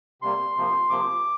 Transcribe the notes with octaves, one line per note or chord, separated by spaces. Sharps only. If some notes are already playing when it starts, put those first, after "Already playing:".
C3 G3 A#3 C6
C3 F3 A#3
C3 F3 A#3 D6